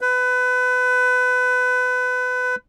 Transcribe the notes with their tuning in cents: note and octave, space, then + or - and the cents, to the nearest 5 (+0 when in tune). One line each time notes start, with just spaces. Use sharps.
B4 +25